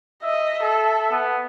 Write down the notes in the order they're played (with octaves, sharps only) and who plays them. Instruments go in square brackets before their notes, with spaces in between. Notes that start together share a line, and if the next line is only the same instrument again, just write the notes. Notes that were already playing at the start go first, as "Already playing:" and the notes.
[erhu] D#5 [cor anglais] E5
[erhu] A4
[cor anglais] B3